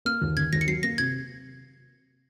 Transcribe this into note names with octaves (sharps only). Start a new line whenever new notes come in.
A#3 F6
D#2
D#3 G#6
D#2 A#6
C#7
F#3 C7
A#3 A#6
C3 G#6